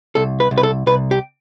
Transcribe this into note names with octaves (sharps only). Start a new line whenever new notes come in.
C2 A4
B4
C2
B4
A4
C2 B4
G4